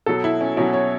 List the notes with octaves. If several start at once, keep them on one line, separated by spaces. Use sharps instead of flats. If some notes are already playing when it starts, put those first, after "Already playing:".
B2 F#3 A4
E4
C#4
B2 F#3 C#4
C#5